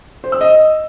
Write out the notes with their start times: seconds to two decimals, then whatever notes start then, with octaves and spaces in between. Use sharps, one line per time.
0.24 C5
0.32 E6
0.41 D#5